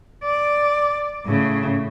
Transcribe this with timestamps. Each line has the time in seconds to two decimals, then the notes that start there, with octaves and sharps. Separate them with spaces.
0.24 D5
1.26 A2 C#3